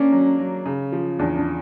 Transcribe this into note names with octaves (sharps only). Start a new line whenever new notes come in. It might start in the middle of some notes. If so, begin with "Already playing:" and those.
Already playing: A#3 C#4 D4
F#3
F#3
C#3
F3
E2 D4
D4